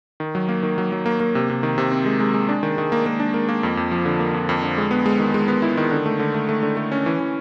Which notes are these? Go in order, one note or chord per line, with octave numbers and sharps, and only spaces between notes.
D#3
F#3
A#3
D#3
F#3
F#3
A#3
A#3
C3
C3
D#3
C3
C4
G#3
G#3
G#3
D4
D#3
D#3
A#3
A#3
D4
A#3
A#3
F2
F2
F3
D3
A#3
F2
F2
D3
G#3
B3
G#3
D#3
G#3
B3
E4
D#3
D3
A3
D3
A3
A3
D3
A3
C#4
E3
E3